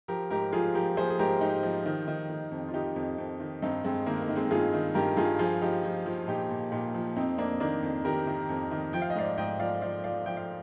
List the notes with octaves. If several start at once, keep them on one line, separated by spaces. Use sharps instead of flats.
F3 G4 A#4
G#2 G4 A#4
F3 F4 G#4
F3 G4 A#4
F3 G#4 C5
G#4
G#2 G4 A#4
G#2 D#4 G4
F3
D#3
D#3
D#3
F2
F4
D#3 D#4 G4
F2
F2
D#3
G2 C4 D#4
G2 G#3 C4
D#3 A#3
A#3
D#3
G#3 C4
G2 F4 G#4
D#3
G2 G4 A#4
G2 F4 G#4
F3 F4 G#4
F3 D#4 G4
F3
F3
A#2 D#4 G4
A#2
A#2 D#4 G4
F3
F2 C4 D#4
F2 A#3 D4
D#3 A#3 D4
F2
D#3 G4 A#4
D#3
F2
D#3
F3 G5
F5
D#5
G#2 D5 F5
G#2 D#5 G5
F3 D5 F5
F3 D5 F5
F3 D5 F5
F3 G5
F5